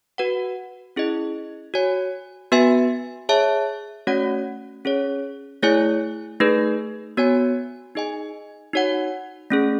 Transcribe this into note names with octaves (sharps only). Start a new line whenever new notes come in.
F#4 B4 F#5
C#4 E4 G#4 D#5
F#4 C#5 G#5
B3 F#4 B4 E5 G#5
G#4 C#5 E5 A5
A3 C#4 F#4 C#5 F#5
C#4 G#4 C#5
A3 E4 G#4 C#5 G#5
A3 D#4 G#4 B4
B3 F#4 C#5 G#5
D#4 G#4 D#5 G#5
D#4 F#4 C#5 F#5
A3 C#4 G#4